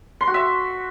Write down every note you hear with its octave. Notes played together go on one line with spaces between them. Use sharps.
C6
F#4
E5